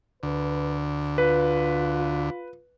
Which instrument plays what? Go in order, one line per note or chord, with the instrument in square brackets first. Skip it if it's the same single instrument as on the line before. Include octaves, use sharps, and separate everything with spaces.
[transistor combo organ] D2 [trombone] B4
[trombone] F4 [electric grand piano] B4